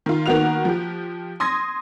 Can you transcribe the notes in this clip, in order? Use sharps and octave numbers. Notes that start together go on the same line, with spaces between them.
D#3 F4
D#3 A#3 B3 F#4 F#6 F7
F3 G4
C6 D#6 G#6 A#6